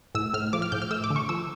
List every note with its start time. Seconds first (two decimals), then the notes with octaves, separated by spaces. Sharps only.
0.15 A2 E6
0.34 A2 F6
0.53 F3 D6
0.62 F6
0.72 A2 G6
0.82 F6
0.91 A3 E6
1.04 D6
1.10 D3
1.16 C#6
1.29 F3 E6